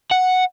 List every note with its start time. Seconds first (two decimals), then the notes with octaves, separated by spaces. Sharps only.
0.12 F#5